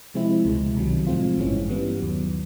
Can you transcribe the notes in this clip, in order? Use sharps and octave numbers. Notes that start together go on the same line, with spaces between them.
C3 F3 G#3 C4 E4
C#2 B2 G#3
C2 C3 D#3 F#3
A2 F3 G#3 C4 F4
G#1 G2 E3 G#3 C#4
G2 E3 G3 B3
D#2 D#3 F#3